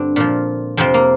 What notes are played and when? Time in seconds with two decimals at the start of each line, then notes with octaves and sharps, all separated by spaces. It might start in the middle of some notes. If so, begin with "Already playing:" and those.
Already playing: G2 D3 C4 D4
0.16 A#2 F3
0.77 F2 C3 F3 C4
0.94 A#3